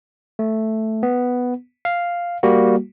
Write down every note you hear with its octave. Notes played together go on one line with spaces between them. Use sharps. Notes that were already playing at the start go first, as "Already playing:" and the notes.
A3
B3
F5
G3 A#3 F#4